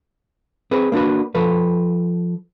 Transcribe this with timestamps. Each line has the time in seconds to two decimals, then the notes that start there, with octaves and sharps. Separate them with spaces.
0.71 C4 G#4 B4
0.92 A#3 D4 F#4 B4
1.35 F3 A4 B4